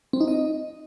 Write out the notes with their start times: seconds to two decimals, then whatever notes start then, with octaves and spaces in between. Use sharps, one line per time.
0.13 C4
0.21 D#4
0.28 D#5